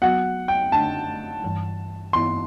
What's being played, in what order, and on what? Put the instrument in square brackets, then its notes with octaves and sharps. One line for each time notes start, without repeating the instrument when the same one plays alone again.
[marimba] F#3 B3 F#4 [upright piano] F#5
[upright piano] G5
[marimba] D3 A3 D4 [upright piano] A5
[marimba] G2 E3 G3
[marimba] G2 E3 B3 E4 [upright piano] C6